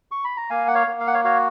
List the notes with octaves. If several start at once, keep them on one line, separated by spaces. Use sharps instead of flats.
C#6
B5
A#5
A#3 F5 G#5
F#5
C#5 F5
A#3
F5
F#5
C#5 F5
F#4 C#5 F5